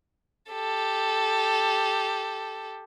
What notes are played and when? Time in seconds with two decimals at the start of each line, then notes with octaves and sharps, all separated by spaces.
0.51 G4 A4